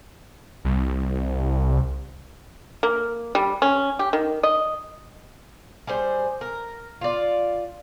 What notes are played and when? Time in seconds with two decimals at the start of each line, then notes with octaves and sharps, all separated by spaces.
0.65 C2
2.83 A#3
3.35 G3
3.62 C#4
3.99 G4
4.13 D#3
4.43 D#5
5.87 G3 G#4 C5
6.41 A#4
7.01 F4 D5